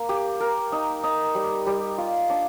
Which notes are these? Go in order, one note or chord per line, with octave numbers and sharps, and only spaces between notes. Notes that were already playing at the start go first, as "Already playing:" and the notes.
Already playing: A#3
G4
A#4
D#4
D#4
G3
G3
F4
D4